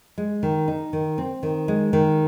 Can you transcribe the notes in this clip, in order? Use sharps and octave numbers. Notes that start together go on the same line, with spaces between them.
G#3
D#3
D#4
D#3
C4
D#3
G#3
D#3